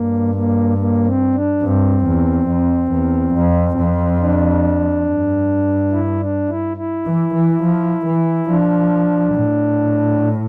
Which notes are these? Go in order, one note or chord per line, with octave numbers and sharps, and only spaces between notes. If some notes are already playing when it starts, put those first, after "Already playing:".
Already playing: G2 A#3
A#3
A#3
C4
D4
G2 C4
E2
F2
E2
F2
F2
D4
G2
E4
D4
E4
E4
E3
E3
F3
E3
F3 D4
A2